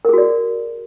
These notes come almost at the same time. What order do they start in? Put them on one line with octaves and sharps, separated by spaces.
A#4 G#4 F#4 D5